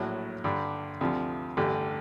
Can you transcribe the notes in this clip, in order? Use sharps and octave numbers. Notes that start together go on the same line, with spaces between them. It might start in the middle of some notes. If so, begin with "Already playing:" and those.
Already playing: A#1 A2 F#3
G2 D3 G3
D2 C3 F3
A1 G2 D3 G3